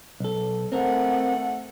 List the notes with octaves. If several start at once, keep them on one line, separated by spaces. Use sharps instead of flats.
B1 A4
A3 C4 A#4 F#5